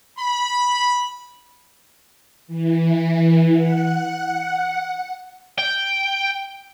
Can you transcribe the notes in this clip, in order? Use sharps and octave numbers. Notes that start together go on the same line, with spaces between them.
B5
E3
F#5
G5